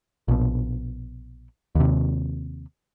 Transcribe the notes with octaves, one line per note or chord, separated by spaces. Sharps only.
A#1 B2
D#2 C3